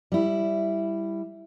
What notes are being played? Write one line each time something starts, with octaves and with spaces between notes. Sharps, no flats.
G3 E4